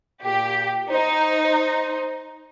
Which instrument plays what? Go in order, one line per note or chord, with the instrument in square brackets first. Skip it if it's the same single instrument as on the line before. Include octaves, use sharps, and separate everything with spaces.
[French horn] A#2 [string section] G4
[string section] D#4 [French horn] C5
[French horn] C5